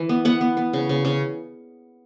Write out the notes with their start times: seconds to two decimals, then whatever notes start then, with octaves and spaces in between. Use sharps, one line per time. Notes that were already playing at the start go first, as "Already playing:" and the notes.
Already playing: E3
0.09 B3
0.25 B3 F#5
0.41 B3
0.57 B3
0.73 C#3
0.89 C#3
1.05 C#3